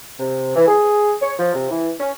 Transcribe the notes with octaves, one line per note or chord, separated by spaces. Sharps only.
C3
E3
G#4
C#5
F3
C3
E3
C#4